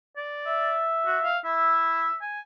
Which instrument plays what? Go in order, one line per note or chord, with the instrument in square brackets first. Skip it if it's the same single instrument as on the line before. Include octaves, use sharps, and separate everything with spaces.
[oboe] D5
[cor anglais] E5
[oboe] F#4
F5
[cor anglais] E4 [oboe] E5
[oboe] G#5